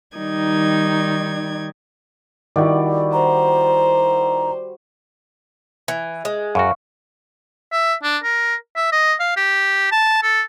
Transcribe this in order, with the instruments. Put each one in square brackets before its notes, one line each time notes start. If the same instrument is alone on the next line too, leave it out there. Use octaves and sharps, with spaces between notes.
[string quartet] D#3 G3 D#4 D5 G#6
[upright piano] D#3 E4 [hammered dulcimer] G3 F#4 D5
[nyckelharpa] C5 [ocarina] A#5
[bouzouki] E3
G#3
[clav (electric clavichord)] F#2 F#4 [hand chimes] F5 C#6
[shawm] E5
D4
A#4
E5
D#5
F5
G4
A5
A4